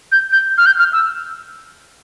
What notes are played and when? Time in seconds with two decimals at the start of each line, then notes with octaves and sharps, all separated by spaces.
0.12 G6
0.32 G6
0.58 F6
0.66 G6
0.79 F6
0.93 E6